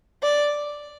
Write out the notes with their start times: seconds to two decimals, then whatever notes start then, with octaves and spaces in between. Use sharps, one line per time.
0.23 D5